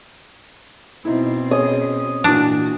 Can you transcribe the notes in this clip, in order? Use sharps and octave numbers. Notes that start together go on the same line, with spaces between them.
B2 C4 D#4 E4
C#4 G#4 C#5 D#5
A#2 E3 D4 F#4